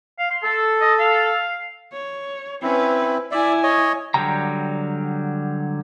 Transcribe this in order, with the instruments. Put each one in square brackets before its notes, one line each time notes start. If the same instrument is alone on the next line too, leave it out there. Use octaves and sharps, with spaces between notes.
[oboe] F5
C6
[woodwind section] A4
[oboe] D#5
F5
[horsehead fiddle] C#5
[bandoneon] C4 E4 [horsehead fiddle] C#4 B4
[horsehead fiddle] E4 G#5 [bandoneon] D5 E5
[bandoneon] C#5 D#5
[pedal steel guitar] D3 F#3 G3 G5 A#5